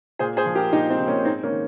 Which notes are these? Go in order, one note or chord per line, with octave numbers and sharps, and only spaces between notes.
A#2 G#4 C5
G#4 C5
F3
G4 A#4
A#2 D#4 G4
C4 D#4
F3
A#3 C#4
G#2 C4 D#4
A#3 C#4
D#3